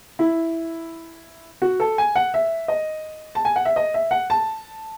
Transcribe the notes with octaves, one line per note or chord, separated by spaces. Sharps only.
E4
F#4
A4
G#5
F#5
E5
D#5
A5
G#5
F#5
E5
D#5
E5
F#5
A5